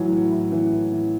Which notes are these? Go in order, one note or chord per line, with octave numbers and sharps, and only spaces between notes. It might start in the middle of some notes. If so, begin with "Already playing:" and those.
Already playing: A2 E3 F#3
A2
A2
E3
A2
E3